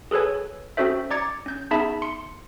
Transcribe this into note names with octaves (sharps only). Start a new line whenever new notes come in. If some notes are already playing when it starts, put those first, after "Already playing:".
G#4 A4 B4 C#5 G#5
C4 C#4 F#4 A4 C5 E5
D5 A#5 D6 G#6 A6 C#7
C#4 G6
B3 D#4 G#4 E5 A5 B5
C6 C#7